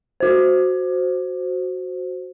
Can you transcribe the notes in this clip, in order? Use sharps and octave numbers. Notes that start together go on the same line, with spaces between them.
F#4 C5